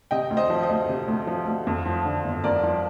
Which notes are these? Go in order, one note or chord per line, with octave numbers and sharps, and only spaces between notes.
C3 D#5 G5
D2
C5 D#5
F3
C5 D#5
D2
C3
D2
F3
D2
F2
F3
D3
G1
F2 A#4 D5
F3